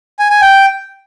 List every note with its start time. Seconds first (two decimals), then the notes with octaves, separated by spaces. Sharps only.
0.19 G#5
0.30 G#5
0.41 G5